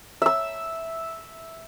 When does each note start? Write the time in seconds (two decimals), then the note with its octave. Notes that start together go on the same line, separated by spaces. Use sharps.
0.22 E5 E6